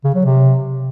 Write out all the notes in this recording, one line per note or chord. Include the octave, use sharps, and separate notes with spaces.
C#3
F#3
C3